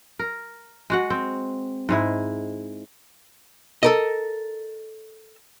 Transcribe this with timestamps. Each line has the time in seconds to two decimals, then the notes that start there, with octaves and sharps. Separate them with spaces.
0.19 A#4
0.90 G#3 F#4 F#5
1.10 C4
1.89 G#2 G#3 E4
3.83 A4 A#4 D#5